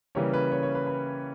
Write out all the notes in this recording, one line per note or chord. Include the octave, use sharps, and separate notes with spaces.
C#3 E3 G3 A#3 C#4 C#5
B4
C#5
C#5
B4
B4